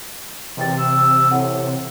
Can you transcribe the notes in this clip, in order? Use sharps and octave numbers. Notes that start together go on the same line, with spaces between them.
E2 C3 D#3 E3 G5 A6
E6
A2 C4 F#5